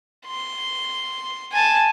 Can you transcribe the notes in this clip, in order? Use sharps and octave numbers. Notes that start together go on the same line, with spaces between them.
C6
G#5 A5